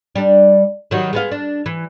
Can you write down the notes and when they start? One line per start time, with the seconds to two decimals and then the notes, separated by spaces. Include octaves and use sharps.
0.15 G3 D4
0.91 D#3 F#3 G3
1.13 G#3 B3 F5
1.32 D4
1.66 E3